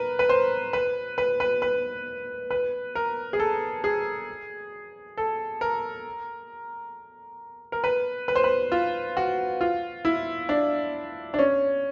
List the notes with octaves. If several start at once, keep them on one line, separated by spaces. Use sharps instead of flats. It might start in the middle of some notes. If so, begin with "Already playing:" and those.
Already playing: A#4 B4
B4
C5
B4
B4
B4
B4
B4
A#4
G#4
A4
G#4
A4
A#4
A#4
B4
B4
C5
B4
F4
F#4
F4
E4
D4
D4
C#4